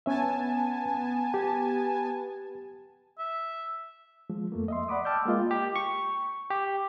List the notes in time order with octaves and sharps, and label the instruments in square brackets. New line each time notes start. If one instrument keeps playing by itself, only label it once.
[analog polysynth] B3 G#5 A5 [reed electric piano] C#4 E5
[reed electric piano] G4
[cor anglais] E5
[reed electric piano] F3 G#3
F2 A3 A#3
D#5 E5 C6
D5 F#5 B5 D6 D#6
G5 A5 D6 E6 F6 G6
G#3 A#3 F4 D#5
[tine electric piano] G4
C#6
G4